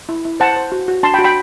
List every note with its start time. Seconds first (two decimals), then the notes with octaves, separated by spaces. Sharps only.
0.09 E4
0.25 E4
0.40 C5 F#5 A5
0.56 C5
0.72 F#4
0.88 F#4
1.03 D4 A5 C6
1.14 G5 B5
1.19 F#4
1.24 G5 B5